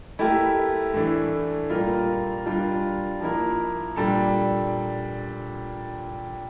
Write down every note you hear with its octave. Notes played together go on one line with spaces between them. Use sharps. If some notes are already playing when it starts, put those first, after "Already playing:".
A3 E4 G4 A#4
A2 E3 A3 D4
A#2 G3 A#3 F4 A#4
G3 D4 F4 A#4
F3 A#3 E4 A#4
A#2 G3 D4 A4